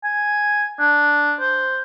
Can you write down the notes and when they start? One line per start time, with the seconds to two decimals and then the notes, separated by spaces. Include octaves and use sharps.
0.04 G#5
0.79 D4
1.40 C5